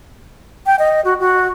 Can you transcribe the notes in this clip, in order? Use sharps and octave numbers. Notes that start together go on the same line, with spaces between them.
G5
D#5
F#4
F#4